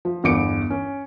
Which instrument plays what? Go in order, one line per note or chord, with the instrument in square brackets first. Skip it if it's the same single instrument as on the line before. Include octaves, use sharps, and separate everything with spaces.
[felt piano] F3
G1 E2 D6 C#7 D7
C#4